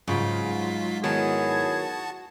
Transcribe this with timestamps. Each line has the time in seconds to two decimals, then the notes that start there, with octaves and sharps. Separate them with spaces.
0.08 G#2 C#3 F#3 F4 B6
1.04 D#3 F#3 B3 E4 F#4 G#4 A5